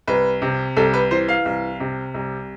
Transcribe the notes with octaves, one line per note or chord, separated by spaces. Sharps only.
C2 B4
C3
C2 A4
B4
E3 C5
F5
C2
C3
C2